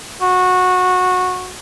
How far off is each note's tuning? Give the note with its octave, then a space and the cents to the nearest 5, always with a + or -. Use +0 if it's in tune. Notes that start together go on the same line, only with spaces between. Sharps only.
F#4 -15